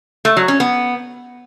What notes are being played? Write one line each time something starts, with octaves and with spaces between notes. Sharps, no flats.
A3
F#3
C#4
B3